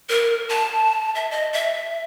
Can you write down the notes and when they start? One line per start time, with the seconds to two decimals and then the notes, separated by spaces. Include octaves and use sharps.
0.09 A#4
0.49 A5
1.15 E5
1.31 D#5
1.53 E5